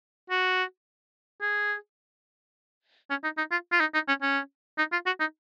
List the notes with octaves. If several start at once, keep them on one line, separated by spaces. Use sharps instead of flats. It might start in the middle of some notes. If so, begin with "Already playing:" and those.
F#4
G#4
C#4
D#4
D#4
F4
F4
D#4
D#4
C#4
C#4
D#4
F4
F#4
D#4